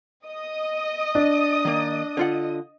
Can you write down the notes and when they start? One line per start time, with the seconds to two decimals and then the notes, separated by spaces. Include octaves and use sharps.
0.26 D#5 D#6
1.15 D4
1.65 D#3 A#3
2.17 D3 F4 F#5